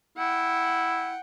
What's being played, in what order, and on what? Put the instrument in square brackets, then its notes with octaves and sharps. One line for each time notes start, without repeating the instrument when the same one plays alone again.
[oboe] E4 [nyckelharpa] F#5 G5